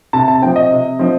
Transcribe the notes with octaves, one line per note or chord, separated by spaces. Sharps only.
C3 A5
A5
F3 C4 G5
D#5
C3
F3 C4